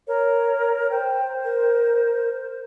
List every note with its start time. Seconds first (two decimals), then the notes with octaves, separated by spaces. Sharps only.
0.08 A#4 C#5
0.91 C5 G5
1.45 A#4